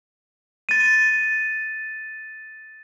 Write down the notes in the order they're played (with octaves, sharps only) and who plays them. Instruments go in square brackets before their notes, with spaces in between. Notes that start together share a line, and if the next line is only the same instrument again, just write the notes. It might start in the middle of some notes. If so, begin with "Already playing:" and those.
[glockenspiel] A6 D#7